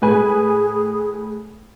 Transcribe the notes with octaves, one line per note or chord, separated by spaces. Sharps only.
A2 G#4 B4 G#5